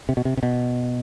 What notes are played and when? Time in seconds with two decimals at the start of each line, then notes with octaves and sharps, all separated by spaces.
0.09 C3
0.17 B2
0.25 C3
0.37 C3
0.43 B2